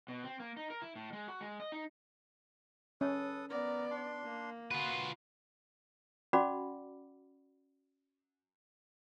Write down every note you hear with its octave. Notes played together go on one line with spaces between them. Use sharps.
B2
C4
A#3
D#4
A#4
E4
A2
G#3
F#4
G#3
D#5
D#4
C#4 A4 B4 D#6
B3 A#4 D5 A#5
D4 C6
A#3
F4 F#4 B4 C6
C#4 F#4 D5 F#5 B5 D6